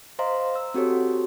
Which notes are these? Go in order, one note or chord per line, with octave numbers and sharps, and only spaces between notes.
C5 D#5 F5 A#5 C6
E6
C4 F#4 G4 A4 C#5